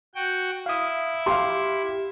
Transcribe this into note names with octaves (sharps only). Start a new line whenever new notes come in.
F#4 G5
E4 F5 D#6
G4 F5 C6